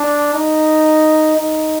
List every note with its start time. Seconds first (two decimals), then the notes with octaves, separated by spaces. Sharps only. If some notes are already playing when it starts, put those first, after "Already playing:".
Already playing: D4
0.34 D#4
1.37 D#4